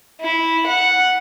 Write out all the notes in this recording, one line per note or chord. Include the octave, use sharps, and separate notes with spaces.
E4
F#5